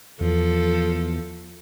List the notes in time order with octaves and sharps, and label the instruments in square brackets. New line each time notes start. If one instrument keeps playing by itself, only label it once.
[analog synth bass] E2 [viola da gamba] F3 A4